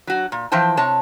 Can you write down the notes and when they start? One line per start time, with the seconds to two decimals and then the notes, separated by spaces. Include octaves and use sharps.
0.07 F#3 F#4
0.32 A#2
0.52 E3 F3 C5 G5 A5
0.77 C3 C#5 A5